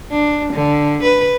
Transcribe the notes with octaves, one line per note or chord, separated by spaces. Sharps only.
D4
D3
B4